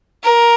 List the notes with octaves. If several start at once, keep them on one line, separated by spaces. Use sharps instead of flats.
A#4